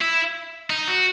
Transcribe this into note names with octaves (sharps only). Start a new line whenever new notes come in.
E4
D#4
F#4